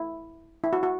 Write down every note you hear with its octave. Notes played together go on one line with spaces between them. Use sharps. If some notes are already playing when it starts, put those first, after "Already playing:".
Already playing: E4
E4
F#4
F#4